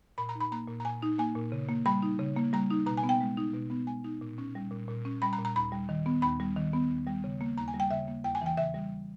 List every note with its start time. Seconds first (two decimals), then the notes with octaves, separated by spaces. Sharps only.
0.18 A#2 B5
0.29 A#5
0.35 D#4
0.40 B5
0.52 A#3 A#5
0.68 A#2
0.80 A#5
0.85 A#2 G#5
1.02 D#4
1.18 A#3 G#5
1.35 A#2
1.52 C#3
1.68 A#3
1.86 G3 B5
2.03 D#4
2.19 C#3
2.36 A#3
2.53 G3 A#5
2.70 D#4
2.86 B2 A#5
2.97 G#5
3.03 B3
3.09 G5
3.21 G#3
3.37 D#4
3.54 B2
3.70 B3
3.87 G#3 G#5
4.04 D#4
4.21 A#2
4.38 C#4
4.55 G3
4.71 A#2
4.88 A#2
5.05 C#4
5.22 G3 B5
5.33 A#5
5.38 A#2
5.45 A#5
5.56 D#2 B5
5.72 G3
5.89 D#3
6.06 B3
6.22 D#2 B5
6.40 G3
6.56 D#3
6.73 B3
6.90 D#2
7.07 G3
7.24 C#3
7.41 A#3
7.57 D#2 A#5
7.68 G#5
7.74 G3
7.80 G5
7.91 C#3 E5
8.08 A#3
8.24 E2 G5
8.35 G#5
8.41 E3 G5
8.57 C#3 E5
8.74 G3